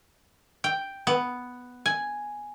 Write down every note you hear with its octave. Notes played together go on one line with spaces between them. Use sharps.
G5
B3
G#5